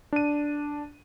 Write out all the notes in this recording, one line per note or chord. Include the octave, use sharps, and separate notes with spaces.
D4 D#7